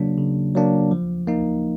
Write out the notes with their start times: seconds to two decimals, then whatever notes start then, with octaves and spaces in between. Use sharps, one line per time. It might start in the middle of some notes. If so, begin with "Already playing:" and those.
Already playing: C#3 F#3 A#3 D4
0.18 C#3
0.55 F#3 A#3 D4
0.91 F3
1.27 A#3 D#4